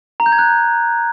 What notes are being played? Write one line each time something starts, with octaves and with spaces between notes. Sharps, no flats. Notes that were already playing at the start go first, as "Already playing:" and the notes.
A#5
G6
G#6
F#6